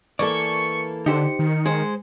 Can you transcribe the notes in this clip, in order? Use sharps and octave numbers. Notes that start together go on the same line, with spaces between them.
E3 A#3 A4 D5 C#6
D3 D#4 G4 C5 C#7
D#3
G#3 G#4 C5